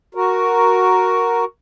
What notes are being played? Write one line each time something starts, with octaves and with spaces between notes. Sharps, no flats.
F#4 A#4